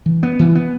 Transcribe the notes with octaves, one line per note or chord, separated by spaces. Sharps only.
E3
B3
E3
B3